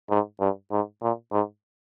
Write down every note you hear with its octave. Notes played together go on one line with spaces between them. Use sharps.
G#2
G2
G#2
A#2
G#2